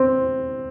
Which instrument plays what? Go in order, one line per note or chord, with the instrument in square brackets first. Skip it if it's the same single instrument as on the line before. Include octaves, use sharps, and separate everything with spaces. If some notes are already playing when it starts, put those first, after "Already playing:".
Already playing: [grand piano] C4